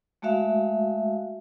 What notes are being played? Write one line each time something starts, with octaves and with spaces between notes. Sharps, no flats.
G#3 A3 F#4 E5 F5